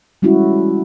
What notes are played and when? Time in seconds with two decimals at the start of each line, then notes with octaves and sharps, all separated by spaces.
0.22 G3 G#3 C#4 E4 F#4